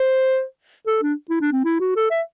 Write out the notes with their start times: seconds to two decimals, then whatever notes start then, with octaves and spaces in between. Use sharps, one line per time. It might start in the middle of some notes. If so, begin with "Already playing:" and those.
Already playing: C5
0.87 A4
1.02 D4
1.30 E4
1.41 D4
1.52 C4
1.64 E4
1.80 F#4
1.96 A4
2.11 E5